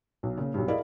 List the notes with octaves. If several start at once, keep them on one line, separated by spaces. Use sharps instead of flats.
B1
A#2 C#3
B1 G2
E4 G#4 A#4 D5 D#5 F5